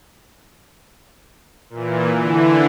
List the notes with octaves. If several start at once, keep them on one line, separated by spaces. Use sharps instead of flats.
A#2 E3
D3 E3